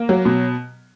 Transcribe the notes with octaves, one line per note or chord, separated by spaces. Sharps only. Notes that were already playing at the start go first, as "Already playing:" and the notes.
Already playing: A#3
F#3
B2